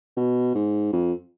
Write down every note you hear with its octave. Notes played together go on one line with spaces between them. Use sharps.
B2
G#2
F2